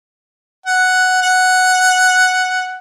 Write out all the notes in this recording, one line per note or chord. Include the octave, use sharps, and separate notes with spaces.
F#5
F#5